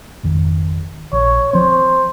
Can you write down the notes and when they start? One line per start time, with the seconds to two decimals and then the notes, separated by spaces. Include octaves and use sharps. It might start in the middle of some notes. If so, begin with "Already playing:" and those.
0.23 G#1 F2 D#3
1.12 A#1 C#5
1.53 F3 C4 C5